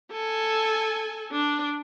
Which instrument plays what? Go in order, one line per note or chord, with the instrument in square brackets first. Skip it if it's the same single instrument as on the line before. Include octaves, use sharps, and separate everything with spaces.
[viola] A4 G#5
D4